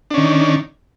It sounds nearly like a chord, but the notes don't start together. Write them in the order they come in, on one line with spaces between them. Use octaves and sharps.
D4 C#4 D#3